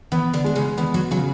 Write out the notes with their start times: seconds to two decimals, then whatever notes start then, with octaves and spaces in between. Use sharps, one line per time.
0.12 E3 B3 E4
0.33 D3 D4
0.44 G#3 D4
0.55 C#3 C#4
0.77 E3 B3 E4
0.94 F#3 F#4
1.11 C#3 F#3 F#4